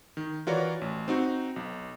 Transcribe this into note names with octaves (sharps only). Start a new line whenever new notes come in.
D#3
E3 F4 F#4 A#4 C#5 D5
A1
C4 D#4 F#4
B1